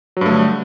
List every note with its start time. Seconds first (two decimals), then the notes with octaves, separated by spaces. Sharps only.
0.17 F#3
0.21 G2
0.26 A3
0.30 D3